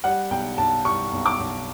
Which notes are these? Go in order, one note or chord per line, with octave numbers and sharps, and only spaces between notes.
G3 F#5
B1 G5
B1 A5
G3 C#6
B1
D6
B1